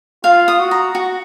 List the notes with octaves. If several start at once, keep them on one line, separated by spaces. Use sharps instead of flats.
F4 F5
D#6
F#4
A#5
F#4